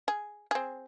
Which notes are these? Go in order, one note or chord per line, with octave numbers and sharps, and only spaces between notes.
G#4
C4 G#4